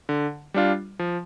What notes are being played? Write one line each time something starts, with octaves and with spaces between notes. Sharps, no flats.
D3
G3 D4 F4
F3